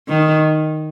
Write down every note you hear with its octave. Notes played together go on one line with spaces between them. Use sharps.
D#3